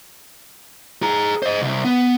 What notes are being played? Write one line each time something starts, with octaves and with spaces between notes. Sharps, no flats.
G#4 A#5
C5 D#5
C2
B3